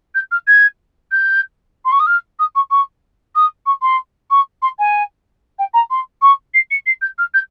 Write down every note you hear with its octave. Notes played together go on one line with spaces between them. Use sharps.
G6
F6
G#6
G6
C6
C#6
D#6
F6
D#6
C#6
C#6
D#6
C#6
C6
C#6
C6
G#5
G5
A#5
C6
C#6
C7
C#7
C7
G6
F6
G6